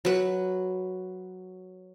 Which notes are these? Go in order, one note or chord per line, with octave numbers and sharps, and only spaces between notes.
F#3 B4